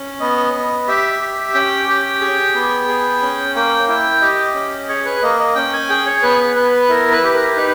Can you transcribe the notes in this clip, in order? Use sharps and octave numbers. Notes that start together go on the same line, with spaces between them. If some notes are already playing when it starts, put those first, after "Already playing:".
Already playing: C#4
B3 D#5
B3
G4 E5
G4
C#4 G5
G4
G#4
B3
G#4
C#4
A#3 G5
E4 G5
G4 D#5
C#4
G#4 C#5
B4
A#3 D#5
D#5
C#4 G5
G#5
G#4 G5
C#5
B3 B4
B3 B4
E4 A#4
B4
G4
A#4
D#4 B4